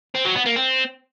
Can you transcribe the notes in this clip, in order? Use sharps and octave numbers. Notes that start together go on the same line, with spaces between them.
C4
F#3
B3
A#3
C4